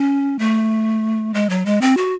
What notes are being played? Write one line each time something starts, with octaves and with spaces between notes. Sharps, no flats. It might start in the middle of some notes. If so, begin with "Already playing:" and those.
Already playing: C#4
A3
G#3
F#3
G#3
C4
F#4